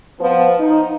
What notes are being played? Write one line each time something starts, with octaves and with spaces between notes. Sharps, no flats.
F3 B3
D#4